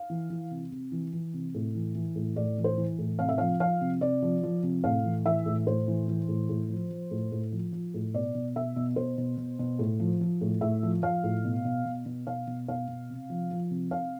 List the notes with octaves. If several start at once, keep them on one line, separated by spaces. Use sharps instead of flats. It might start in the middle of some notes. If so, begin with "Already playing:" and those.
Already playing: F5
E3
E3
C3
C3
E3
E3
C3
A2
E3
E3
A2
A2 D5
E3
C5
E3
A2
C3 F5
E5
F3 F5
F3 F5
C3
C3 D5
F3
F3
C3
A2 F5
E3
E3 E5
A2
A2 C5
E3
E3
A2
A2
F3
F3
A2
A2
F3
F3
A2
B2 D5
B2
B2 E5
B2
B2 C5
B2
B2
B2
A2
F3
F3
A2
A2 E5
F3
F3 F5
A2
B2
B2
B2
B2
B2 F5
B2
B2 F5
B2
C3
F3
F3
C3
C3 F5